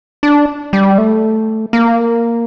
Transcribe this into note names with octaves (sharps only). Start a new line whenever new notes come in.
D4
G3
A3
A#3